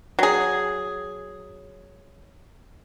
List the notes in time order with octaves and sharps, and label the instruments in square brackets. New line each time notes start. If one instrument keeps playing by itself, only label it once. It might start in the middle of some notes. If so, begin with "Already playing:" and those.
[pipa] F#3 G#4